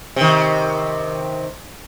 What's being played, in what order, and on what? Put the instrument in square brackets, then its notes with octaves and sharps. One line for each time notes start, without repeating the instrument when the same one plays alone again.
[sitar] C3 D#3